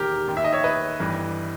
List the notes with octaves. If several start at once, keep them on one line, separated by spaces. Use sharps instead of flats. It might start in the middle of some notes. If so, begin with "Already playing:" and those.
Already playing: E1 D#2 D#3 G4 A#4
D#2 D#3
E5
D#5
C#5 E5
B4 D#5
G1 G2 E3